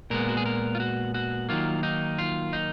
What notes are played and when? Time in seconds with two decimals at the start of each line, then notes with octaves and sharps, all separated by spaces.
0.10 A#2 G#3 B3 A#4
0.29 F#4
0.37 G#4
0.46 A#4
0.75 F4
0.80 F#4
1.14 F#4
1.49 D#3 F#3 A#3 F4
1.83 D#4
2.19 F4
2.53 D#4